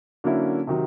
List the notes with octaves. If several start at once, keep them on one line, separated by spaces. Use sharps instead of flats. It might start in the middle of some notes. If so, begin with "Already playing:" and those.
D3 F#3 A#3 C#4 E4
C3 D#3 F#3